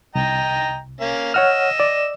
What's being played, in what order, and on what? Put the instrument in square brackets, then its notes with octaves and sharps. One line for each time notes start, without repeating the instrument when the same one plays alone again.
[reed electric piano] C2 [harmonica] D#5 G5 A#5
[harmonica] A#3 C#4 F5
[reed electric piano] C#5 F#5 F6 [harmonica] D#5 E6
[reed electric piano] D5